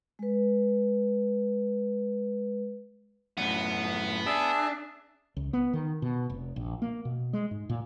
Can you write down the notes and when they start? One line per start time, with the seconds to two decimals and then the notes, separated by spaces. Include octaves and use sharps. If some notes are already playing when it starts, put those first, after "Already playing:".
0.19 G#3 B4
3.37 F#2 A2 B3
4.26 D4 G#4 E5 A5
5.37 C#2
5.53 B3
5.73 D#3
6.02 B2
6.30 F1
6.56 A#1
6.82 A#3
7.05 B2
7.33 G#3
7.51 G#2
7.69 A#2